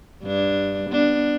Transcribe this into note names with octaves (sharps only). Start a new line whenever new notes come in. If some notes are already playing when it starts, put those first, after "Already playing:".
G2 D4
B3 D4